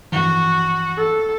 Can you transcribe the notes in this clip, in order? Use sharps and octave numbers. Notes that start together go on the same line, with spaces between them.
G2 E3 F3 F#4
A4